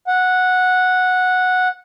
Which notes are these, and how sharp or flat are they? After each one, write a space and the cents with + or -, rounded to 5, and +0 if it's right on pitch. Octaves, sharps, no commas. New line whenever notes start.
F#5 -10